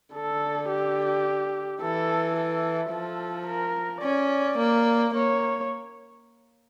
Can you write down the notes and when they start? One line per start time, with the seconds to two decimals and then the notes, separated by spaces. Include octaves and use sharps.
0.14 D3 A4
0.69 G4
1.81 E3 A4
2.37 A4
2.91 F3 A4
3.47 A#4
4.02 C#4 D5
4.59 A#3
5.14 A#3 C#5